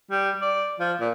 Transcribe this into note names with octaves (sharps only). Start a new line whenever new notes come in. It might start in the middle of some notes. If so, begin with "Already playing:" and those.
G3
D5
F3
A#2